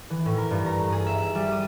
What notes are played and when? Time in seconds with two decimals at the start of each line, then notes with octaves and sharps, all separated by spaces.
0.10 E3
0.26 A2
0.37 A#4
0.51 G2
0.66 A#5
0.78 A3
0.92 G#4
1.06 E5
1.18 E5
1.35 G3
1.52 D#6